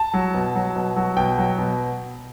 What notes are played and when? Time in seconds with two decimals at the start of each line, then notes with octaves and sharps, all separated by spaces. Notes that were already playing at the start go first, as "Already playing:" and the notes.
Already playing: A5
0.14 F#3
0.34 B2
0.55 F#3
0.76 B2
0.96 F#3
1.17 B2 G5
1.38 F#3
1.58 B2